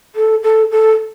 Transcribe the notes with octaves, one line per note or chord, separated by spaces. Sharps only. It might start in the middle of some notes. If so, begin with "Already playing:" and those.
A4
A4
A4